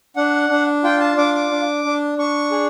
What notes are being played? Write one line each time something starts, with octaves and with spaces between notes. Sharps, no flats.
D4 F#5
D4
F4 G5
A5
D4 D6
D6
D4
D4
D4 C#6
G#4